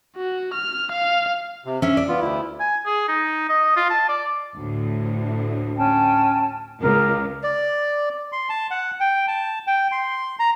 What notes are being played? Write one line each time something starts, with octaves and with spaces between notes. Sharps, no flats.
F#4
F6
F5
C3
C#4 D4 E5
D5
B3 F4
D2 E4
G#5
G#4
D#4
D#5
F4
A5
D5
D2 A2
C#4 G5 A5
C#2 A#4
D5
C6
A5
F#5
G5
A5
G5
C6
A#5